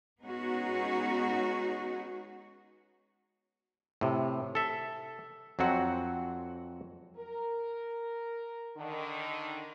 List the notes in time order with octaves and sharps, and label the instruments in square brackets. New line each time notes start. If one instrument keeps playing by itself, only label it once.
[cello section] G#3 B3 C#4 D#4 F#4 G#4
[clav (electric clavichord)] A2 C3
A4 E5
F2 F#3 C4 F#4 F#5
[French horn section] A#4
D3 D#3